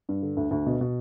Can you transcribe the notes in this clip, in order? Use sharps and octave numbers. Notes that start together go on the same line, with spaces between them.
G2
D3
D2
D2
B2
B2